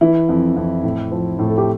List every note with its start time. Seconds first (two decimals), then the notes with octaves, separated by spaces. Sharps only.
0.01 E3 E4
0.29 F2
0.56 F2
0.83 A2
1.11 F3
1.39 A2
1.47 A4
1.58 G4